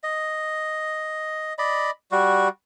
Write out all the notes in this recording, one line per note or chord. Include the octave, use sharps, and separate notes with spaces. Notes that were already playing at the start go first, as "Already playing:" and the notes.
D#5
D5 D#5 B5
G3 F#4